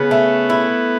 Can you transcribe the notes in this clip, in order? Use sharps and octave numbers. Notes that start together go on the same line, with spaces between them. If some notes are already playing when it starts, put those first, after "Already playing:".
Already playing: C#3 B3
A3
E4